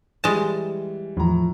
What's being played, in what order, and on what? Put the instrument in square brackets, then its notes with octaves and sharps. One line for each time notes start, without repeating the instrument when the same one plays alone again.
[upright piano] E3 G3 [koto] G#3 A5
[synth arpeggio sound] E2 E3 [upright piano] A2 A#5 [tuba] F3